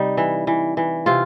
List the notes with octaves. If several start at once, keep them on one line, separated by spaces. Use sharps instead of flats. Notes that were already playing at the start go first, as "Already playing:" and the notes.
Already playing: C3 G3 D#4
E3
E3
E3
C3 F4